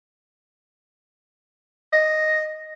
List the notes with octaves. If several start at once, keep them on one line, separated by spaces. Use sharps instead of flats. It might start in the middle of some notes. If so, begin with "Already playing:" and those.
D#5